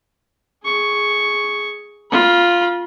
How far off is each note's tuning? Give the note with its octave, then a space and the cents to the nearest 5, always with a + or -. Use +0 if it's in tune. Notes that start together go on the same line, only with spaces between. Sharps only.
G#4 +5 C#6 +0
F4 +0 B5 -35